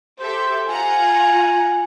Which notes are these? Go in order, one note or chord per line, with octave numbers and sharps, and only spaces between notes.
G4 A4 C5 E5
F4 F#5 G#5 A#5